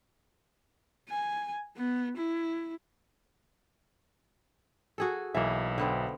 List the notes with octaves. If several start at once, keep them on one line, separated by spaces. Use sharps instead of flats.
G#5
B3
E4
F#4 G#4 A4
B1 B2 E3 A#3 E5
D3 B3 C4